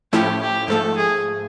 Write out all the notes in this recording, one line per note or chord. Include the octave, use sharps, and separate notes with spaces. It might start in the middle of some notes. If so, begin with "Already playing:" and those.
A2 F3 A3 C#4 E4 G4
G4
G#2 F3 A3 A4
G#4